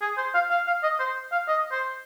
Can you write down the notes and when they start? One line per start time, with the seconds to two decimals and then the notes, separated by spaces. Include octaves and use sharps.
0.01 G#4
0.17 C5
0.34 F5
0.50 F5
0.67 F5
0.83 D#5
1.00 C5
1.32 F5
1.48 D#5
1.72 C5